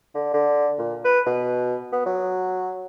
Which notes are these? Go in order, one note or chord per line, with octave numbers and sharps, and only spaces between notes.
D3
D3
A#2
B4
B2
B3
F#3